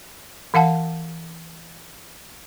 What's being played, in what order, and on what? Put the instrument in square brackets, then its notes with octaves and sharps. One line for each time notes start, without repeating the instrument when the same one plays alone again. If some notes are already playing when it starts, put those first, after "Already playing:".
[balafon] E3 F5 F#5 A5